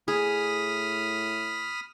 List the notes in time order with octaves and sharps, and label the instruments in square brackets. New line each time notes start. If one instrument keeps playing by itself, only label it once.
[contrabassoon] A2 [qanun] G#4 [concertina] B5 D#6 F6